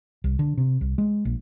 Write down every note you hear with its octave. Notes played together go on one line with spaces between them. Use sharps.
C2
D3
C3
C2
G#3
A#1